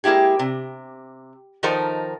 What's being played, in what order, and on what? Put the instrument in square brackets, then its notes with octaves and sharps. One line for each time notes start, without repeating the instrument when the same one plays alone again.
[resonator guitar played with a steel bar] G#3 A#3 E4 G4 G#4
C3
D#3 F3 D#4 A4 A#4 C5